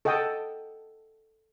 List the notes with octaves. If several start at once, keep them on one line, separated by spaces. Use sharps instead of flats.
A4 D#5 F#5 G5 A5 D#6